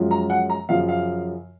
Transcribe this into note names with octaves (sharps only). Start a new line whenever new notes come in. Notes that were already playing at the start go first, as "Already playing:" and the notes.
Already playing: F#2 F3 G#3 C#4 F4
A#5
F#5
A#5
F#2 C#3 F3 F5
F5